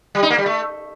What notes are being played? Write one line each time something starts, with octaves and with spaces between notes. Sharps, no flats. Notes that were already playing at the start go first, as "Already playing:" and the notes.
G3
D#4
A#3
G3
A3